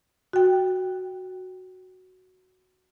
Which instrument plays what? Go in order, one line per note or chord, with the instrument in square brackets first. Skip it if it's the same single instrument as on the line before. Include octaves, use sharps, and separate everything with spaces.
[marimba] F#4 G5